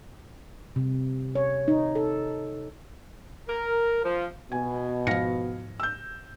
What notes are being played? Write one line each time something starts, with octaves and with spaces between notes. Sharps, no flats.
C3
C#5
D#4
A4
A#4
F3
B2 G#5
G#2 F3 F5 A#6 C#7
E6 G6